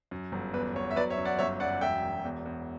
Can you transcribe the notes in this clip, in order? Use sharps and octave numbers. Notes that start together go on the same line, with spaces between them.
F#2
G1
E2 B4
E2 C#5
E5
F#3 B4 D5
C#5 E5
F#2
D5 F#5
G1 C#5 E5
F#2 D5 F#5
E1 E5 G5
E1
E2
E2